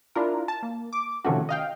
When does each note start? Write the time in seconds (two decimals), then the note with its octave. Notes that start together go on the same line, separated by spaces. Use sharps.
0.15 D4 E4 F4 A#4
0.48 A5
0.63 A#3
0.93 D6
1.25 C3 D#3 F3 A3 C#4 F#4
1.49 D#5 F5 G5